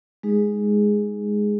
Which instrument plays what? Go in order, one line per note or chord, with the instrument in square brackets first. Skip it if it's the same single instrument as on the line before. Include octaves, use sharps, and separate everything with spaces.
[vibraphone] G#3 D#4 G#4